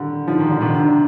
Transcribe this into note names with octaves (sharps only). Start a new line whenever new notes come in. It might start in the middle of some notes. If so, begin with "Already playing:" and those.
Already playing: D3 D#3 G3
F3 D#4
D#3
D3
C3 D#3
D4